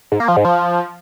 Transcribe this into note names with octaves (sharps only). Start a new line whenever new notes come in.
G#2
A#3
F3
G#2
F3